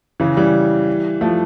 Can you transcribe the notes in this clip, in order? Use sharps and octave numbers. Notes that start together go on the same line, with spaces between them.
C#3 E3
E3 G3
F3 A3